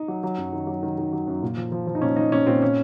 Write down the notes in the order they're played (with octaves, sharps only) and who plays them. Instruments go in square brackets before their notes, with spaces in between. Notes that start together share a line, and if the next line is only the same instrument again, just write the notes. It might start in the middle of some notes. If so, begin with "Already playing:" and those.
Already playing: [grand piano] D#4
F#3
F#3
F#2
D#3
F#3
D#3
D#3
F#3
F#2
A#2
F3
F3
F3
D#4
A#2 C#4
F3 D#4
A#2 C#4
A#2 C4
C#4